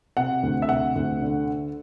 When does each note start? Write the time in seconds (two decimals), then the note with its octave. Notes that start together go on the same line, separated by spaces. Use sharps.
0.17 C3 F#5
0.43 D2
0.62 E5
0.69 C3 F#5
0.96 D2
1.22 D3